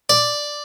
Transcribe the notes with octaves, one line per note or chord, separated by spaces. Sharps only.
D5